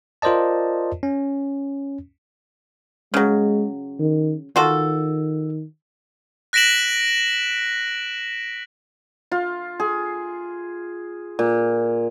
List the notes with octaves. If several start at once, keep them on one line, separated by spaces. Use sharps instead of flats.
F4 A#4 C5 D5 D#5 A5
C#4
C#3 F#3 G#3
D#3
D#3 F4 F#4 A4
F#6 A#6 B6 D7 E7 F#7
F4
G#4
A#2